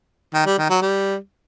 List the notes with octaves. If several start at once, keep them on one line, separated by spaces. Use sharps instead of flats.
D#3
G3
D#3
F#3
G3